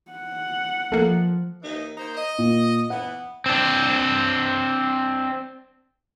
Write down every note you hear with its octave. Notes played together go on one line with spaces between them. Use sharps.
F#5
F3 A3 A#3
D#2 E3 D#4
A#3 D#4 C5
D#5
A#2
E3 B3 F#5
C4 D4